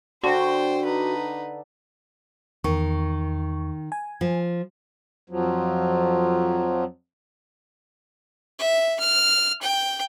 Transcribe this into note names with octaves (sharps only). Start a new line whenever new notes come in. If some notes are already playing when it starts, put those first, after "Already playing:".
D3 F#4 C5 G5
D#4 B4
E2 D#3 C#6
G#5
F3
F2 F3 F#3
E5
F6
G5